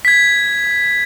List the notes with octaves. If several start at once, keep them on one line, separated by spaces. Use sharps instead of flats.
G#6 B6